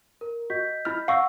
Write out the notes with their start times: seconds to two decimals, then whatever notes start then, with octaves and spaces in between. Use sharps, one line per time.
0.21 A#4
0.50 F#4 D#5 G6 B6
0.85 E4 F6
1.08 F5 F#5 C#6 E6 A#6